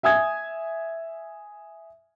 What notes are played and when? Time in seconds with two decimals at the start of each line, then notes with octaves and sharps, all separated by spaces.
0.03 E5 G#5 D#6 G#6